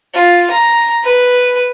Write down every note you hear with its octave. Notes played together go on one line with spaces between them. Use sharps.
F4
A#5
B4